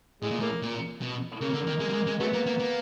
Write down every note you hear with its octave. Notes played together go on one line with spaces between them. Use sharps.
A2 G#3
A#2
A2 A#3
A#2
B2
C#3 A#3
D3
D#3
G#3
G3
G#3
G#3
F#3 G#3 A3 B3
A#3
A#3
A#3